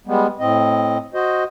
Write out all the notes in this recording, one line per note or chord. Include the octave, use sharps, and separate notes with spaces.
G3 G#3 B3
A2 C4 D#5
F#4 C5 D#5